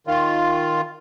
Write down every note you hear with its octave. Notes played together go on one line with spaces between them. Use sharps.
D#3 F4